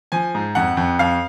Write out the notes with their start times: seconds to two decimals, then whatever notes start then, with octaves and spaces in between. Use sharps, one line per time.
0.12 F3 G#5
0.35 G#2
0.55 F2 F#5
0.77 F2
0.99 F2 F5